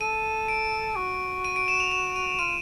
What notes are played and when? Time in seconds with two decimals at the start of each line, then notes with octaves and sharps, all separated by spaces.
0.01 A4 D#7
0.48 D7
0.96 F#4
1.44 D#7
1.56 D7
1.68 E7
1.80 F7
1.91 E7
2.16 D#7
2.39 F4 D#7